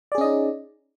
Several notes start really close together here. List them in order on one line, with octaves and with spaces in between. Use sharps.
D5 G#4 C#4 D#5 D#4